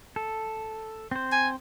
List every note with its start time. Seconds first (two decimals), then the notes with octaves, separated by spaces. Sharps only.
0.16 A4
1.11 C4 C5
1.32 G#5